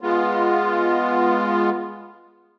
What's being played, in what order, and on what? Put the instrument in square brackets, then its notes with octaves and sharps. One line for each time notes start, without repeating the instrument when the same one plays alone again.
[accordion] G#3 B3 F4